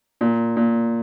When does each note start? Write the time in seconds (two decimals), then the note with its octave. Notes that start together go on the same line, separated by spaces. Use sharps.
0.21 A#2
0.57 A#2